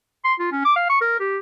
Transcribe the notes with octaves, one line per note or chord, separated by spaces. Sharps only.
C6
F4
C#4
D6
F5
C#6
A#4
G4